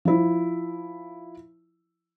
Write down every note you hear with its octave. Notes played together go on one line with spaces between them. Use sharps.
F3 E4